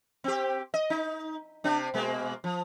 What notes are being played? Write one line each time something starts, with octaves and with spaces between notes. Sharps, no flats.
C4 G4
D#5
D#4
C3 C4 D4
B2 G#3 A#3
F3